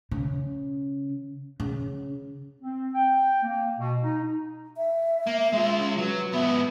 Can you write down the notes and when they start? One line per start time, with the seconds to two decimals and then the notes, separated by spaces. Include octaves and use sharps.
0.11 C#3
1.60 C#3
2.61 C4
2.95 G5
3.43 A#3
3.78 B2
4.03 D#4
4.24 D#4
4.77 E5
5.27 A#3
5.52 G#3 F4
5.79 C#4
5.98 F#3 B4
6.33 G#2 B3 E5